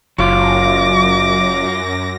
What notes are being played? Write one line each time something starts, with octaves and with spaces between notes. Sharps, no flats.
F#1 F#2 F#3 F4 D6 A#6